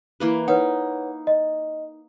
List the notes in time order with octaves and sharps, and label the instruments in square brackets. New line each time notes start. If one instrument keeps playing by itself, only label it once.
[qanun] E3 A#3 B4
[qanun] D#4 [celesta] B4 C#5 F#5
[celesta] D#5